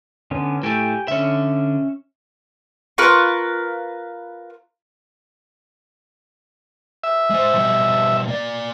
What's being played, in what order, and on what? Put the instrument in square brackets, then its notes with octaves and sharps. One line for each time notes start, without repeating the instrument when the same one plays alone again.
[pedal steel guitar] D3 B3 C#4
[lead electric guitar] A2 A3 [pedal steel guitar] G4 G5 G#5
[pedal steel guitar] D3 [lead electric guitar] C#4 E5
[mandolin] F4 A#4 B4 C#6
[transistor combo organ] E5
[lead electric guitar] G#3 C5
B2 G3
A#3 D5